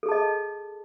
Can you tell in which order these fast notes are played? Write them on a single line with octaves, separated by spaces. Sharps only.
A4 G#4 A5 D#5